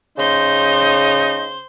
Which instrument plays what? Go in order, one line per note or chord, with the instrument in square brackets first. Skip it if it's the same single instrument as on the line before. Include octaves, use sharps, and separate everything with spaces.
[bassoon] C#3 [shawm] D#4 [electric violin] C5 C6